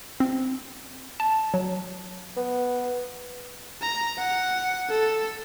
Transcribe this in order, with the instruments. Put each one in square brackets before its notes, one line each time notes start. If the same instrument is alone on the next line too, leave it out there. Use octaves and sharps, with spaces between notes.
[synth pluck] C4
A5
F#3
[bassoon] B3
[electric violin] A#5
F#5
A4